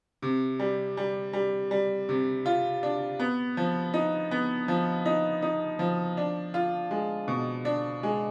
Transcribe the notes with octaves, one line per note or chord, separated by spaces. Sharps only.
C3
G3
G3
G3
G3
C3
F4
D4
B3
F3
D#4
B3
F3
D#4
D#4
F3
D4
F4
G#3
B2
D4
G#3